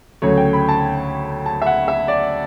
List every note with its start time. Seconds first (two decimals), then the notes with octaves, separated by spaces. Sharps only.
0.22 D2 C#3 F#3 A3 C#5
0.37 G5
0.53 B5
0.69 A5
1.46 A5
1.62 E5
1.66 F#5
1.88 E5
2.08 D5